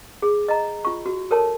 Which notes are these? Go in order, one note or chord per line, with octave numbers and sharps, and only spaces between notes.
G#4
D#5 A#5
F4 C#6
F#4
A4 A#4 C#5 A5